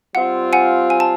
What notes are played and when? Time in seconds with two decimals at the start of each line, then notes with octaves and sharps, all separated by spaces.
0.15 G3 C4 F4 F#5
0.53 F#5 G#5
0.90 G#5
1.00 A5